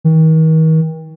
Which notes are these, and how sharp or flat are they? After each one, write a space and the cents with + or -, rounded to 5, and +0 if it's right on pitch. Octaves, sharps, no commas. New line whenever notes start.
D#3 +40